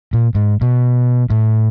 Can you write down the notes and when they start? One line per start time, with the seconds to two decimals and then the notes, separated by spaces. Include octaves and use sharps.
0.13 A#2
0.35 G#2
0.61 B2
1.30 A2